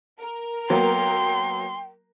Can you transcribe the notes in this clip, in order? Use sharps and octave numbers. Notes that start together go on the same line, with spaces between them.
A#4
F#3 A#3 B3 G5 C6